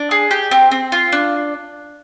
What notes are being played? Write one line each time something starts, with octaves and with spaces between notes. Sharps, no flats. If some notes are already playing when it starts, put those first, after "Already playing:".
Already playing: D4
G#4
G4
C4
C4
F4
D4